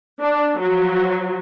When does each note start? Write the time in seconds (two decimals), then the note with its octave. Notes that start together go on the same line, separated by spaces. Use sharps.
0.23 D4
0.61 F3 F#3